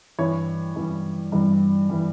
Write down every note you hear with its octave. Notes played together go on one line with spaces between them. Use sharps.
G2 E3 G3 C#5
G2 E3 G3
G2 E3 G3
E3 G3